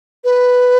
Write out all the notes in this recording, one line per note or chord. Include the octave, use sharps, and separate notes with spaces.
B4